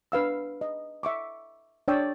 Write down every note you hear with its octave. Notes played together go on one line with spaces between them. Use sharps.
D4 B4 F5 E6
D#5
E5 C#6 D6
D4 C#5 D5 G5 D#6 E6